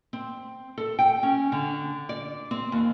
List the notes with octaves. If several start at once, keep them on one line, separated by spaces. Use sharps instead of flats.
C4
A4
G5
C#4
D3
D5
C4
D#2